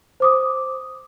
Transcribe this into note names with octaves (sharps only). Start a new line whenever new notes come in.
C5 D6 D#6